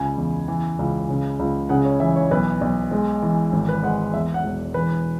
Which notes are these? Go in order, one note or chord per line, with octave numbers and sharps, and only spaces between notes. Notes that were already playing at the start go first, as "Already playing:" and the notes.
Already playing: C#2 C#3 G#5
E2
E3
C#2
C#3
C#2
C#3 F#5
C#5
E3 E5
C#5
B1 B4
B1
G#3
E3
G#1
B4
G#3 F#5
E2 E5
F#5
E1
E3 B4